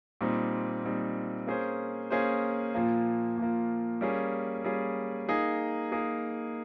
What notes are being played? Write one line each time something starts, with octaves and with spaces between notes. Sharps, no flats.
A#2 G3 C4 D#4
A#2 G3 C4 D#4
A#3 C#4 G#4 C5
A#3 C#4 G#4 C5
A#2 F3 A#3
A#2 F3 A#3
G3 A#3 C#4 G#4
G3 A#3 C#4 G#4
A#3 D#4 G#4
A#3 D#4 G#4